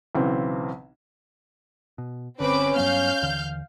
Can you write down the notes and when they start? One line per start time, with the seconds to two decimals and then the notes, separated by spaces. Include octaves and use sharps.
0.15 B1 C#3 E3 C4
1.98 B2
2.40 G1 D3 C4 C#4 B4 D6
2.76 G2 F#3 B3 F5 F6 G6
3.22 D#2 D3 E3